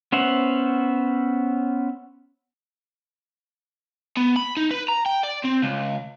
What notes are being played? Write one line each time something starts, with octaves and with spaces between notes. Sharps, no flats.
B3 C#4 C5 E5 F#5
B3
B5
D#4
B4
A#5
G5
D5
C4
C#2